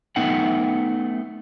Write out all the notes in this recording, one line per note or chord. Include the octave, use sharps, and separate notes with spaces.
A3 B3 D#4 E5 F#5 G5